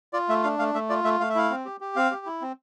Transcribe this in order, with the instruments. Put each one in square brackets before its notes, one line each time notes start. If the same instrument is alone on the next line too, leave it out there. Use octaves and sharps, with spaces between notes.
[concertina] F4 D5
A3 E5
D4 F5
A3 F5
A3 E5
F4 D5
A3 E5
A3 F5
E5
E4 F5
C4
G4
G4
C4 F5
G4
E4
C4